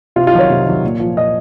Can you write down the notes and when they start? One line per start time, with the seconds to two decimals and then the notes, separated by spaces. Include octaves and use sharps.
0.16 C3 F4
0.27 F4
0.33 D#3 F#3
0.39 C#5
0.50 C3
0.66 D#3 F#3
0.84 A#2
1.00 F3
1.17 A#2 D#5